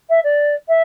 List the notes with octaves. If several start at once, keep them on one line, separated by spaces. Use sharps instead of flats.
E5
D5
E5